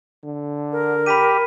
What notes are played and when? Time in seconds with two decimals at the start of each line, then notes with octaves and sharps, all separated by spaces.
0.23 D3
0.72 A#4
1.06 G4 B5 B6 D#7